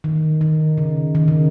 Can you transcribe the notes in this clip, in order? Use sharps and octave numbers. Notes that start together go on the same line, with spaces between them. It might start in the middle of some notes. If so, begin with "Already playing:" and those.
D#3
D#3
C#3
D#3
C#3